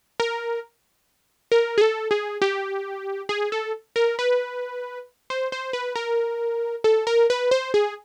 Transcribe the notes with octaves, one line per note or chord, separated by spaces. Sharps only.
A#4
A#4
G#4
A4
G#4
G4
G#4
A4
A#4
B4
C5
C5
B4
A#4
A4
A#4
B4
C5
G#4